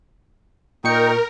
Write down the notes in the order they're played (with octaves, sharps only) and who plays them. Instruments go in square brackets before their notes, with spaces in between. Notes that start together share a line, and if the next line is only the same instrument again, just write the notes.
[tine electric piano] A#2 C#6 C#7 [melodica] D#4 G5 [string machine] A#4